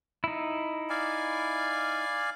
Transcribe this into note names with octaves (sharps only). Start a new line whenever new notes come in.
D#4 E4
D5 F5 G#5